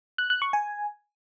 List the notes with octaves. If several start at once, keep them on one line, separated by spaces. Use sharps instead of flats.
F#6
F#6
C#6
G#5